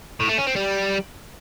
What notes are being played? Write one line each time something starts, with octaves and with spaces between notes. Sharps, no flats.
A2
A3
C#4
C4
G3